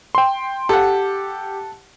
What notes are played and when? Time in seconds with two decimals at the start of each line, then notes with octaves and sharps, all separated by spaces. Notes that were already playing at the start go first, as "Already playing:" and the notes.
0.15 G5 C6
0.69 G4 A4 F#5